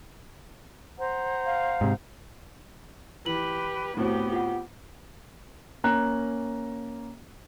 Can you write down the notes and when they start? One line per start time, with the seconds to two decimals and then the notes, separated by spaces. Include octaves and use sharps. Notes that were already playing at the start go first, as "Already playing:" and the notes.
0.98 C5 F#5 A#5
1.46 F5
1.81 G#2 C3
3.26 E3 G4 B4 F#7
3.97 A2 B3 C4 F#4 G4
4.33 F4 F#5
5.84 A#3 C#4 A#5 F#6